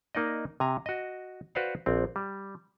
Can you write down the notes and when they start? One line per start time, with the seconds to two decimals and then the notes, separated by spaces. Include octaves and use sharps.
0.15 A#3 D#4 D5 D#5
0.60 C3 G#5 A#5
0.86 F#4 D#5
1.55 F#4 B4 C5 D5 F5 F#5
1.86 A#1 C4
2.16 G3